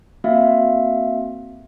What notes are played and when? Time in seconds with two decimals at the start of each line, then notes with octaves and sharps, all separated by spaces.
0.24 A#3 C4 F#4 E5 F5